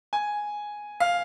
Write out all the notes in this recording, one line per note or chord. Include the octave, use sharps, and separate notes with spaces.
G#5
F5